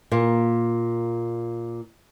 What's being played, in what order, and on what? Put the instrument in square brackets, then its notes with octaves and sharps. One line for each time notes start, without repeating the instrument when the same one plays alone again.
[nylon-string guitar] A#2 A#3